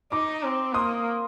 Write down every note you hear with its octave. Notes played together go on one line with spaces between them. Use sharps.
D#4 A#5 D6
C4
A#3 C6 D#6